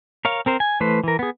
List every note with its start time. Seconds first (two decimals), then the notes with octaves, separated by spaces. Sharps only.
0.25 A#4 C#5 F5
0.46 C4 A#4 C5
0.60 G#5
0.80 E3 A3 B4 C5
1.04 E3 A#4
1.19 B3 G#4